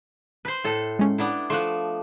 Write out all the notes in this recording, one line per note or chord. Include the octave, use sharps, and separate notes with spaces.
B4 C5
A2 A4
G#3 C#4
B3 D4 E4
F3 A3 C6 F#6